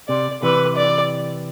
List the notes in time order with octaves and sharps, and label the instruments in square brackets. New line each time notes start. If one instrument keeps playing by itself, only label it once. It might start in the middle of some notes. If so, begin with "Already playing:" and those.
[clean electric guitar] C3 [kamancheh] D5
[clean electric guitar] C3 E3 [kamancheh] B4
[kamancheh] D5